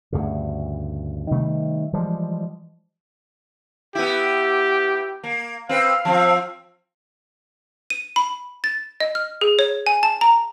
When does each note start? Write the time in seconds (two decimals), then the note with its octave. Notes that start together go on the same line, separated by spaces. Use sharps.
0.13 D2 G2 C#3
1.31 C3 D#3 G3 A3
1.93 E3 F3 G3 G#3
3.95 B3 E4 G4
5.24 A#3
5.69 C4 B4 F5
6.05 F3 C4
7.90 D#7
8.16 B5
8.64 A6
9.00 D#5
9.15 F6
9.41 G#4
9.59 C#5
9.86 G#5
10.03 A5
10.21 A#5